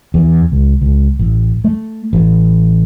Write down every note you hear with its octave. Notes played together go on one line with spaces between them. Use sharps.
E2
C#2
C#2
A1
A3
A1